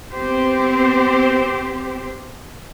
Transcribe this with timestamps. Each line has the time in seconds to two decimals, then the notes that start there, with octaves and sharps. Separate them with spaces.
0.13 B3 C4 G4 C5